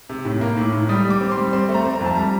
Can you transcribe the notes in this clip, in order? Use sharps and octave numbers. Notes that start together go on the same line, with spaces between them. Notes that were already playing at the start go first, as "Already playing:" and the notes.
C3
A2
A#3
A2
A2
G3 D#6
G3
D6
C4
C6
G3
C4 C6
A3
A#5
C4
A#5
F2 A5
G3 A#5